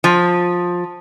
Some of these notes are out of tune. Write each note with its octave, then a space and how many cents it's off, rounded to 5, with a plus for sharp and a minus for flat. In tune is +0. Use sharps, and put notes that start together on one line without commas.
F3 +15